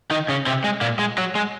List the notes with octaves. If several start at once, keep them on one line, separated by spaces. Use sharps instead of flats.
D#3 D#4
C#3 C#4
C3 C4
G#3
A#2 A#3
G#3
F#3
G#3